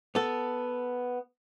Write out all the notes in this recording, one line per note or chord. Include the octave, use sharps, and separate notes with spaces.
B3 A4